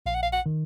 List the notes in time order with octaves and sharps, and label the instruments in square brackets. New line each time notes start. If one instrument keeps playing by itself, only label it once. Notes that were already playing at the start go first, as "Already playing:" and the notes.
[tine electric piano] A#1 [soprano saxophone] F5
[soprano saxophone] F#5
F5
F#5
[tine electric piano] D#3